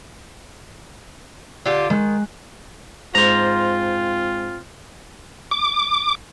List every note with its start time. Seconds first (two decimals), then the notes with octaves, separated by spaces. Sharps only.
1.66 D3 F4 G4
1.90 D#3 G#3 F#6
3.15 G#2 C4 F4 C5 A#5
5.51 D6